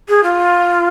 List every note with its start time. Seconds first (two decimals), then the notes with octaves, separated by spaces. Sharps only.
0.09 G#4
0.24 F4